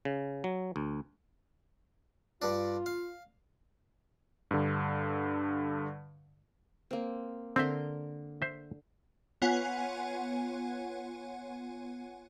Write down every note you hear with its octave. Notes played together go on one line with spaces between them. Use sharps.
C#3
F#3
D2
G2 D4 F4
F5
G2 D3
A#3 C4
D3 C4 A#4 E5 C6
C5 E5
B3 F4 C#5 F#5 G#5